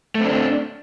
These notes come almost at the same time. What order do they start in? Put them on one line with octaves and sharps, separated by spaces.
A3 C4 D4